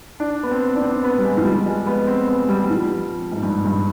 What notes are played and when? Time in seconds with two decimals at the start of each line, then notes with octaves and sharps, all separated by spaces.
0.20 D4
0.43 B3
0.51 C4
0.76 D4
0.82 C4
1.03 B3
1.18 G3
1.25 G#3
1.37 F3
1.45 G3
1.66 G#3
1.87 B3
2.07 C4
2.28 B3
2.49 G3
2.64 G3
2.70 F3
3.32 G#2
3.43 G2
3.65 G2